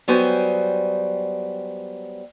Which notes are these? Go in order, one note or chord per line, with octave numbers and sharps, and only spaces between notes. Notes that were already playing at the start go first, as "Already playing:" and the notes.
F#3 G3 B3 C5 G5 G#5